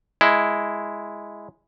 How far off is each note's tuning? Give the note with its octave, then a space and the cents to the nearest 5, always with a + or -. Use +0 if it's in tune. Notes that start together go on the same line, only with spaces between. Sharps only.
G#3 +0 E4 +0